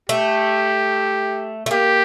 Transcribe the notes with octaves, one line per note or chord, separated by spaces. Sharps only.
A3 G4
A3
A#3 G4